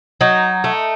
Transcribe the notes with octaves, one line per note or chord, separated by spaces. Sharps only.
F#3 D#4
A3